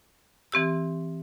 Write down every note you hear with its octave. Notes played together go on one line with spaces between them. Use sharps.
E3 C4 G4 E6